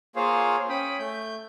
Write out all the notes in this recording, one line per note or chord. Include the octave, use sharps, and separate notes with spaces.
A#3 F4 G#4 C5 C#5 F5
C#4 G5 B5 D#6
A3 G6